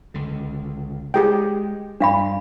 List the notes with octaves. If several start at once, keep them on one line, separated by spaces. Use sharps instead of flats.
C#2 D3
G#3 G4 G#4 G5
G2 G3 D4 F5 B5